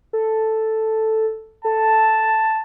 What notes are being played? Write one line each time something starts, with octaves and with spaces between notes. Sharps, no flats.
A4
A4 A5